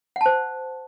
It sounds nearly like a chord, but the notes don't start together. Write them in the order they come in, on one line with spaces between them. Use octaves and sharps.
F#5 A5 C5